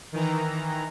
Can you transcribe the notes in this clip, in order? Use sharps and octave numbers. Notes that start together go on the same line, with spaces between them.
D#3 E3 A#5